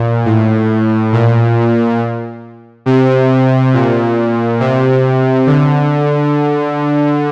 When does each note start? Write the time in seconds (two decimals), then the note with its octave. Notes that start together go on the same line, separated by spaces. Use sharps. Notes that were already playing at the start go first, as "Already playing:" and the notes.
Already playing: A#2
0.26 A2
1.12 A#2
2.86 C3
3.74 A#2
4.60 C3
5.47 D3